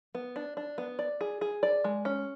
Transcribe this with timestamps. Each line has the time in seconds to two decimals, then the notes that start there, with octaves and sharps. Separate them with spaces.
0.15 B3
0.36 D4
0.57 D4
0.78 B3
0.99 D5
1.21 G#4
1.41 G#4
1.63 D5
1.84 G#3
2.05 C#4